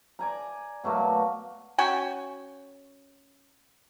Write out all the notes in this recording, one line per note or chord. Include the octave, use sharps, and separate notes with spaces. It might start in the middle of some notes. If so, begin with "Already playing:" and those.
D5 G#5 A#5
B2 F#3 A3 A#3
C#4 F#4 G5 G#5